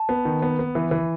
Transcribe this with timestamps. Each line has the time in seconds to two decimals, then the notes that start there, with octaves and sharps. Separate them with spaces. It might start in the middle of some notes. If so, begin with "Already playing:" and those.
Already playing: A5
0.09 B3
0.25 D#3
0.42 B3
0.59 B3
0.75 E3
0.91 E3